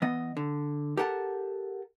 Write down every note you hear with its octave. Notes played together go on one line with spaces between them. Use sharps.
E3 B3 D#5
D3
G4 A4 A#4 F#5 G#5 A5